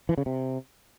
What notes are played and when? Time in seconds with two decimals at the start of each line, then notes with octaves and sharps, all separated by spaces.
0.09 E3
0.18 C#3
0.26 C3